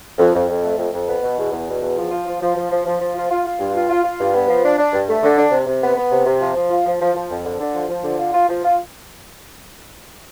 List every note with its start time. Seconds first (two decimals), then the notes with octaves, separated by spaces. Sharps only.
0.19 F2
0.34 F2
0.49 F2
0.64 A3
0.78 F2
0.93 F2
1.08 B3
1.23 B2
1.37 E2
1.52 E2
1.67 B2
1.82 E2
1.97 F3
2.12 F4
2.26 F3
2.41 F3
2.56 F3
2.71 F3
2.86 F3
3.00 F3
3.15 F4
3.30 F4
3.44 F4
3.60 G2
3.74 F4
3.90 F4
4.04 F4
4.19 G2
4.33 B3
4.48 F3
4.64 D4
4.78 D4
4.93 G2
5.08 A3
5.22 D3
5.37 D4
5.52 C3
5.67 C3
5.82 B3
5.96 B3
6.11 C3
6.26 C3
6.41 F3
6.56 F3
6.70 F4
6.85 F3
7.00 F3
7.15 F3
7.30 F2
7.44 D3
7.59 D3
7.74 F3
7.88 F3
8.04 D3
8.18 F4
8.34 F4
8.48 F3
8.63 F4